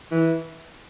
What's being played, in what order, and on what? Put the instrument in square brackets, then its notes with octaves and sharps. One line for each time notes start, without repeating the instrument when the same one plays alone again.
[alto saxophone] E3